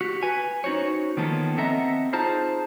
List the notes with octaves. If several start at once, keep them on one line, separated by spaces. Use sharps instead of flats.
F#4 G4
B4 G#5
C#4 D#4 F#4 C5 C#5
D#3 F3 A#3 B3 C#4 A4
C4 A4 D#5 E5 F#5 A#5
D#4 F4 G#4 C5 A5 A#5